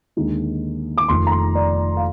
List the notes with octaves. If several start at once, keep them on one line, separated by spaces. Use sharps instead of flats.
D#2 D3 G#3 D#4
D6
F1 F2 D#3 C6
A#5
C6
D5
F5